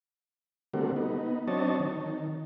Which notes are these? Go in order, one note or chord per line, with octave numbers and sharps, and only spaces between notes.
D3 G3 A3 A#3 C4 F#4
B3 D#4
F#3 C4 D4 C#5 D#5 A5
D#3